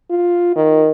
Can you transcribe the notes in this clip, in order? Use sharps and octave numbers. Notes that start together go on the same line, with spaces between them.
F4
D#3